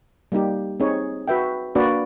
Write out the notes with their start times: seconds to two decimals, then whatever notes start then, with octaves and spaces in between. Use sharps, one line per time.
0.32 G3 A#3 D#4 G4
0.80 C4 D#4 G#4 C#5
1.28 F#4 B4 E5 G5
1.75 A#3 D4 F#4 B4 D5